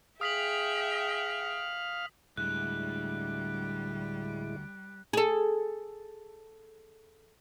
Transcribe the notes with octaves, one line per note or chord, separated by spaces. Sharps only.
G#4 E5 F5 G5 D#6 B6 F#7
D2 A2 D3 G3 G#3 E4 F#6
G#4 A4